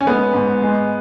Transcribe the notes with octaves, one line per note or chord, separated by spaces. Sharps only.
C#4
G#3 B3
G#2
G#3